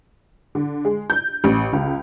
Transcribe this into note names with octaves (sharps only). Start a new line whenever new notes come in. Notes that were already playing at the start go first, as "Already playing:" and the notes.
D3
G#3
G6
A1
C#2